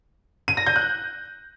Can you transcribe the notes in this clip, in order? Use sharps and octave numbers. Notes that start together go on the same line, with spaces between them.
D#7
A#6
G6
F#6